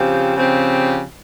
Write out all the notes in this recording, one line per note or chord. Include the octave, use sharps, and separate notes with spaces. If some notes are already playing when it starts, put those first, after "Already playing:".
Already playing: C#3 F3 C4 G4
C#3 F3 C4 G4